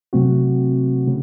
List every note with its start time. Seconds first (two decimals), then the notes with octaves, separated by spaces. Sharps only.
0.13 C3 F#3 A3 C4 F#4
1.07 C#3 A3